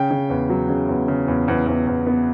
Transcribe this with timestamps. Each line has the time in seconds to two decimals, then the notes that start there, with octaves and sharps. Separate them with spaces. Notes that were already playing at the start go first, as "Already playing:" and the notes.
Already playing: C#3 G5
0.11 C#3
0.30 E2
0.50 F#3
0.69 C#3
0.89 E2
1.08 C#3
1.28 E2
1.48 E2
1.67 E2
1.87 E2
2.07 B3